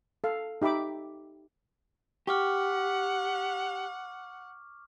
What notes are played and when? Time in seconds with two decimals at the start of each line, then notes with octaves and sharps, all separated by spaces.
0.24 A4 F5
0.62 D#4 G4 E5 B5 D6
2.27 G4 F#5 C#6 D6 F6